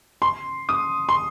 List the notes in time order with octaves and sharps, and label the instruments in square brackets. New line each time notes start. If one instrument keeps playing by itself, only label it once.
[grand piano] C6
D#6
C6